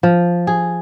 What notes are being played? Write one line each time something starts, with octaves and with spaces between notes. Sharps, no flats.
F3
G#4